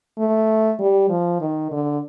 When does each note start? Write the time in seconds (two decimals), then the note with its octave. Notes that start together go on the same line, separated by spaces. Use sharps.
0.18 A3
0.80 G3
1.10 F3
1.41 D#3
1.71 D3